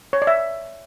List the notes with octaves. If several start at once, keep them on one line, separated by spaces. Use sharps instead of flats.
C#5
D5
E5